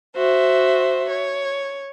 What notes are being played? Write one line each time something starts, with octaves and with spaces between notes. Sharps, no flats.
F#4 C5 E5
C#5